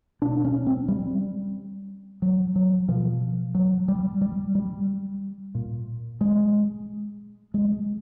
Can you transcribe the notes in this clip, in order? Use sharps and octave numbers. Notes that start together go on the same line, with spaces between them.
B2 D4
C#4
C4
G3
F#3
F#3
B2 F3
F#3
G3
G3
G3
A#2
G#3
G#3